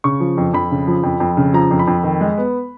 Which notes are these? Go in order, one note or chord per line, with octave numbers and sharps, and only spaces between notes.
C#3 C#6
F3
F2
F2 B5
C#3
F3
F2
F2
C#3
F3 A#5
F2
B5
F2
D#3
G#3
B3